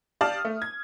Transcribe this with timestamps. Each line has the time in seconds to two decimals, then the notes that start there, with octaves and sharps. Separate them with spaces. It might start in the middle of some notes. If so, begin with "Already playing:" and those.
0.21 G4 D5 F5 A5 D#6 F6
0.45 A3
0.62 G#6